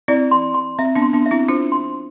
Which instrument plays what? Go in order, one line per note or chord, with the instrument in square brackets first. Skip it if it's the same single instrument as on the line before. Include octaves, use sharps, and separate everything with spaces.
[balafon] C4 E4 [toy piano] D5
[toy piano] C6
C6
[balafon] C4 [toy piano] E5
[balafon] B3 D4
[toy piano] C6
[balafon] B3 D4
[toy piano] E5
[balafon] C4 E4
[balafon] D4 F4 [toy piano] C5
[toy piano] C6